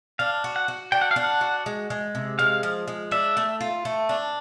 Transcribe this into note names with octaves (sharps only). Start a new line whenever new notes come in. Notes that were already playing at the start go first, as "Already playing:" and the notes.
D4 F5
F#4
F#5
F#4
D4 G5
F#5
F5
D4 F#5
F#4
G#3
G#3
C3
G#3 F5
F3
G#3
D4 E5
A3
F4
A3
D4